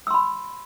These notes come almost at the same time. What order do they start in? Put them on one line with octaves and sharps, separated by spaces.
E6 C6 B5